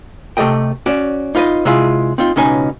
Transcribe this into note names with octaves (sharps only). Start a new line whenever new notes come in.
C3 A3 G4 A4 D#5 G5
C#4 F#4 D5
D#4 F4 B4 C5 D#5
C3 G#3 E4 F4 G#4
C4 D#4 F4
C#2 B2 C#4 D#4 B4 G#5